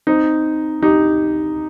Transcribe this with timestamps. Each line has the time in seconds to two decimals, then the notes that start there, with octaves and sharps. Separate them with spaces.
0.07 C4 D#4
0.82 D#4 G4